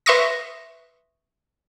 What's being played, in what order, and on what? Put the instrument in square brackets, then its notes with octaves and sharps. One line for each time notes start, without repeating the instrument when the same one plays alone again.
[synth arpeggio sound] B4 E5 C6 C#6 D#6 A#6